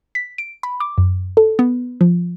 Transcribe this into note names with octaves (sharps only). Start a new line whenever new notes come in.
B6
D7
B5
D6
F#2
A4
B3
F3